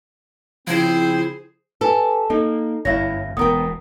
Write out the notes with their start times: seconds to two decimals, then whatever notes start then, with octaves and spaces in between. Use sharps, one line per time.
0.67 C#3 F3 C4 E4 G#4 C5
1.81 G4 A4 B4 G#5
2.30 A#3 D#4 A4
2.85 G1 F#2 E4 C#5 E5 F5 A#6
3.37 E1 B2 B3 A#4 G5 D#6